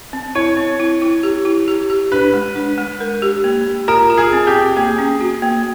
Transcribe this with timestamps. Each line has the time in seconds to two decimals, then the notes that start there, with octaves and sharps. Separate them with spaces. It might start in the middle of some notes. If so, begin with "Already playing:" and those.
0.13 C4
0.35 E4 C#5
0.57 C4
0.80 E4
1.02 E4
1.23 G4
1.45 E4
1.68 G4
1.90 G4
2.12 D4 B4
2.34 G#3
2.56 D4
2.78 G#3
3.00 A#4
3.22 G4
3.44 A#3
3.66 G4
3.88 F4 A#4
4.10 F4
4.17 G#4
4.33 C4
4.47 G4
4.54 C4
4.76 A#3 G#4
4.99 C#4
5.21 F#4
5.42 A#3